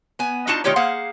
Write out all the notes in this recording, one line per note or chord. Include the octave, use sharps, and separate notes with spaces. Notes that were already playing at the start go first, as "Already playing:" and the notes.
B3 G#5
D4 D#4 F4 F#4 A5
D#3 A3 F4 G4 C#5 D5
A#3 G#4 C5 F5 F#5